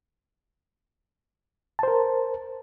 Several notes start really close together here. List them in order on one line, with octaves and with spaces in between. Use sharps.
A5 C5 A#4